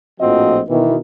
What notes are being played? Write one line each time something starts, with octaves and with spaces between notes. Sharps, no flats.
A#1 A2 F3 C4 F#4 D#5
B2 D#3 E3